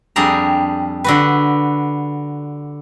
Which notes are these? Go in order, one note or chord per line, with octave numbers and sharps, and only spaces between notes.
F2 G3 D4 G#4 A#5
D3 F#4 B4